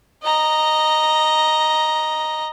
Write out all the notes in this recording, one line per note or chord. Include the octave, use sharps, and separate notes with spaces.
D#5 A#5